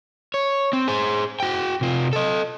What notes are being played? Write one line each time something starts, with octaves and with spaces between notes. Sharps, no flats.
C#5
C4
G#4 C5
F#4 G5
C3 F4
A4 D#5